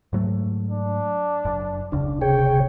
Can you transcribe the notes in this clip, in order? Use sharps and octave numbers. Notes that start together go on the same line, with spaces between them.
G#2 F#3 A3
D4
F#1 F#2
E1 C#2 C#3 D4
C3 G#4 C#5 G5